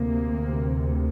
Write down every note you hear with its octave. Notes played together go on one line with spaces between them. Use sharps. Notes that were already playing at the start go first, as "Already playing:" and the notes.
Already playing: D2 C3 A#3